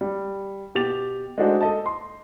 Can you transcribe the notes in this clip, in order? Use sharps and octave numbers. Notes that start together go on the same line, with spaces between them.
G3
B2 G4 A6 F7
G#3 A3 D4 D#4 F#4 C5
A4 D#5 A5
C6